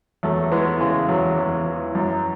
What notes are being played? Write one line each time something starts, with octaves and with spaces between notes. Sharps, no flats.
E2 F#3 A3
E3 G#3 B3
C#3 G#3
E2 F#3
E2
E3
F#2